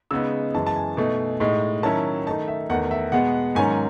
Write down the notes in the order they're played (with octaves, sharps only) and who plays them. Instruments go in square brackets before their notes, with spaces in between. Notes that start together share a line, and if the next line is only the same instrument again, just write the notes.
[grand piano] C#3 G#3 B3 D#4 E6
F#2 E3 G#3 A5
A5
G#5
B2 A3 D#4
A2 G#3 D#4
D#3 F#3 C#4 E4 A5
D#3 A3 D#4 A5
E5
E2 D#3 A3 F#5
E5
B2 G#3 B3 F#5
G#2 D#3 F#3 C#4 G#5